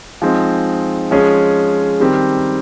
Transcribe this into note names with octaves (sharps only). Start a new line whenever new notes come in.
F3 G#3 C4 D#4
F3 G#3 C#4 G#4
D#3 G3 C4 G4 A#4